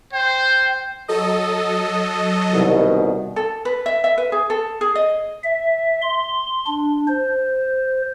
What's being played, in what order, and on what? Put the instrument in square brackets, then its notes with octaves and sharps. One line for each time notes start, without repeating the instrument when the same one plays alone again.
[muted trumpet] C5 [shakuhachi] G5
[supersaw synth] F#3 A4 D#5
[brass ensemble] C2 B2 D#3
[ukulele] A4
B4
E5
E5
B4
G#4
A4
G#4
D#5
[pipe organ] E5
C6
D4
C5